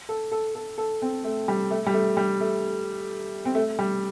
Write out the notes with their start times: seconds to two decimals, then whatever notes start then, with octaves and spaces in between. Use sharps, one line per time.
0.09 A4
0.32 A4
0.55 A4
0.78 A4
1.02 C4
1.24 A3
1.48 G3
1.71 A3
1.86 G3
1.94 A3
2.17 G3
2.41 A3
3.45 C4
3.55 A3
3.79 G3